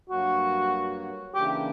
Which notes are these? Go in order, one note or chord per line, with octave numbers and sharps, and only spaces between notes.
G2 F#3 A#3 F#4
C#3 E3 A#3 D4 G4